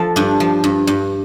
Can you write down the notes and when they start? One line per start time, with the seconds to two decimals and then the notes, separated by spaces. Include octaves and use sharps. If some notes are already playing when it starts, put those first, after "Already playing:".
Already playing: F3 A4
0.16 G2 D4
0.40 F3
0.64 G2
0.87 G2